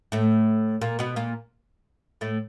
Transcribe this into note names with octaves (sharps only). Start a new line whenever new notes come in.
A2 A3
A#2 A#3
B2 B3
A#2 A#3
A2 A3